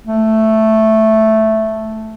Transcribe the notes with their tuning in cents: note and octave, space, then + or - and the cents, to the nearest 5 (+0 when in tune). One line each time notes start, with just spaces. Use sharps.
A3 +0